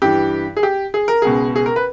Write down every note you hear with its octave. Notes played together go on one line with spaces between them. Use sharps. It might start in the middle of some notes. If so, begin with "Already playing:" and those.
G2 E3 G4
G#4
G4
G#4
A#4
C#2 B2 G#4
G#4
A#4
B4